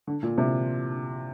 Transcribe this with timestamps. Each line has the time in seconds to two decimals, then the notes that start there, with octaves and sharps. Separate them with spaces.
0.07 D3
0.23 A#2
0.38 C3